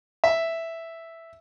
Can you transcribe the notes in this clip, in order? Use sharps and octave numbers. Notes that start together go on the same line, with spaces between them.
E5